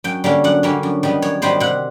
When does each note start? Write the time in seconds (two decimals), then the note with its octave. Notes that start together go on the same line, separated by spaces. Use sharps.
0.04 F#2 G5
0.24 D3 G3 A#3 C#4
0.44 F#2 F#5
0.63 D3 G3 A#3 C#4
0.83 F#2
1.03 D#3 G3 B3
1.22 F#2 C#5
1.42 D#3 G3 B3 C5
1.60 C3 F#5